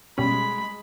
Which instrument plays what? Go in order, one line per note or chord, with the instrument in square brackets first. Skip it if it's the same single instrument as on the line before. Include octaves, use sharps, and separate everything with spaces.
[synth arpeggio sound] B2 G3 C#4 [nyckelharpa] G#3 B5